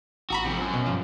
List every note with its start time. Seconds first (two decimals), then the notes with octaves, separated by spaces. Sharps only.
0.30 A1 F#4 A#5 B5
0.44 C3 F3
0.59 F#2
0.74 B2
0.86 G2 F3